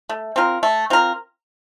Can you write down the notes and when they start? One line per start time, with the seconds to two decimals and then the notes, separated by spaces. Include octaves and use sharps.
0.09 A3
0.36 C4 F4 A#4
0.63 A3
0.90 C4 F4 A#4